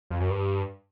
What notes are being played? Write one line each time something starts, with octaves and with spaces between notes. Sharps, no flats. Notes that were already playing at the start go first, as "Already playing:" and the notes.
F2
F#2
G2